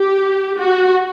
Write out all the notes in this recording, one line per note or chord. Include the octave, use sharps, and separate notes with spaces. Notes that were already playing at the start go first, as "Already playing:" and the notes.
Already playing: G4
F#4